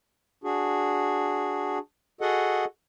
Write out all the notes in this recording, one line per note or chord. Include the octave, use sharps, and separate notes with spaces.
D4 F#4 G#4
F#4 G#4 A4 D#5 F#5